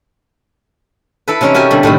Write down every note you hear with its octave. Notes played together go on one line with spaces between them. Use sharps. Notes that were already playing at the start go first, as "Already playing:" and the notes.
E4 A4 B4
C3 E3 C#4 D#4 E4
F#4 G4 A#4 G#5 A5
B2 D3 G3
A2 C3 D#3 G3